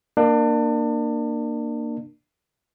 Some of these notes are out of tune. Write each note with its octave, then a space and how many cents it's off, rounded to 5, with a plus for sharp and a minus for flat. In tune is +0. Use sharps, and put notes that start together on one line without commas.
A#3 +0 D4 +30